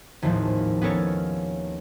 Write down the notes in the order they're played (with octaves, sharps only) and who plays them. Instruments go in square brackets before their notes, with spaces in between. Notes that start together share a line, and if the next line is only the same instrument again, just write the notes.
[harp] G#1 D#2 A2 D#3 F3
B3 C#4 A4 A#4 C#5